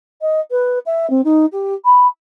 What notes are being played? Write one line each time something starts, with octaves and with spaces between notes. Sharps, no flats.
D#5
B4
E5
C4
D#4
G4
B5